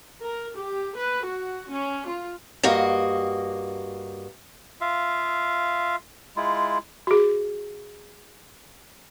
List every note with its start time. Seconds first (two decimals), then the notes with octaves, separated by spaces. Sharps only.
0.23 A#4
0.57 G4
0.96 B4
1.25 F#4
1.71 C#4
2.08 F4
2.63 G2 A#3 F#4 D#5
4.81 F4 E5 F5
6.37 G#3 E4 F4
7.07 F#4 G#4